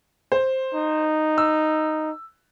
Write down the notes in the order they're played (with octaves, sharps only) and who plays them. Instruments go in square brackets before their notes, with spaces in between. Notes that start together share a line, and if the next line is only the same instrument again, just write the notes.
[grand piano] C5
[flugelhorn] D#4
[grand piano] E6